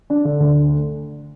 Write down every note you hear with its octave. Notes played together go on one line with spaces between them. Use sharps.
D4
D3
D2